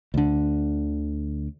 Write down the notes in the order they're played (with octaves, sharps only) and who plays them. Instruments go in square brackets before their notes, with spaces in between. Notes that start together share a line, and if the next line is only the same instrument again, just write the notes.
[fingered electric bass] D2 D3